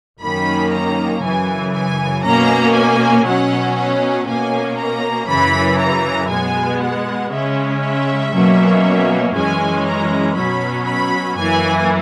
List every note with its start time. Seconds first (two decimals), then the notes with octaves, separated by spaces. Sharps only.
0.21 F#2 D#3 A#3 C#4 B5
0.72 A#5
1.23 F#2 C#3 E3 G#5
1.74 G#5
2.24 B2 A#3 C#4 A#5
2.75 G#5
3.26 B2 F#3 C#4 F#5
3.77 F#5
4.27 B2 A#3 C#4 G#5
4.78 A#5
5.28 F#2 C#3 E3 B5
5.80 A#5
6.30 B2 G#3 B3 G#5
6.81 F#5
7.32 C#3 G#3 C#4 E5
7.82 E5
8.34 B2 F#3 A#3 C#4
9.35 F#2 E3 G#3 C#4 G#5
9.86 A#5
10.36 B2 F#3 C#4 B5
10.87 B5
11.38 F#2 E3 A#3 G#5